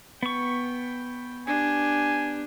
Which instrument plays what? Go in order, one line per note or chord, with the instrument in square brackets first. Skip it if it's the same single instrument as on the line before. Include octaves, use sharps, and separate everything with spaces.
[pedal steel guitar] B3 C#6 [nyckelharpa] G5
[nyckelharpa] D4 G4 [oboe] G#5